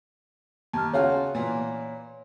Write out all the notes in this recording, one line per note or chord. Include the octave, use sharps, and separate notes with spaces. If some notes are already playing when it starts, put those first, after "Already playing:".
D#2 A5 F6
C#3 F4 F#4 C#5
A#2 E3